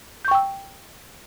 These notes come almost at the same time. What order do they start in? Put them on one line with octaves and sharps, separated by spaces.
G6 C#6 G5 E6